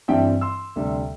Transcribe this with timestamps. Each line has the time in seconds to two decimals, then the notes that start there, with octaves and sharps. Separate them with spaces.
0.08 G2 E3 G3 C4 E5 G5
0.41 C6 E6
0.76 D2 C3 G3